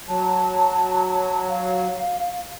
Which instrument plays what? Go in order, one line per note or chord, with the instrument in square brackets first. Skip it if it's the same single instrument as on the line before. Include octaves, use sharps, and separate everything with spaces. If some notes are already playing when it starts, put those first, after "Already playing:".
[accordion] F#3 [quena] A5
[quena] F5